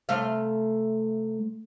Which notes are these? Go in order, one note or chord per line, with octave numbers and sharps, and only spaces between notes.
C3 A3 F5